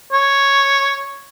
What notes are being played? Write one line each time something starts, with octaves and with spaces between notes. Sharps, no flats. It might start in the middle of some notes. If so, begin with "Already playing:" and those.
C#5